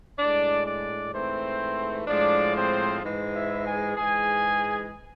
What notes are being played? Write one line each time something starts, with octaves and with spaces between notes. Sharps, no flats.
A2 G#3 D4 D5
D4 D5
G#2 E3 A3 C4 C5
A2 F3 G#3 D4 D5
C4 C5
G#2 E3 G#3
E4 E5
G#4 G#5
G#2 E3 G#3 G#4 G#5